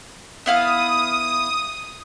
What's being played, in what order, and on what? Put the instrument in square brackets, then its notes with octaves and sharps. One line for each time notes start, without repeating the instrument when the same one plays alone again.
[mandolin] B3 E4 F5 [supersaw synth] D#6